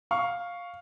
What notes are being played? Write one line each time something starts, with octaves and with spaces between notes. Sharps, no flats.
F5 C#6 F6